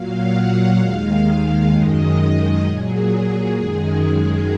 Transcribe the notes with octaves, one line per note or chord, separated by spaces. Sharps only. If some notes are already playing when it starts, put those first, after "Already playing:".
Already playing: A#2 F#3 F5
F#5
F5
D#2 D#3 G#3 F5
F#2 D#3 G#3 D#5
A#2 F#3 G#4
F#2 D#3 G#3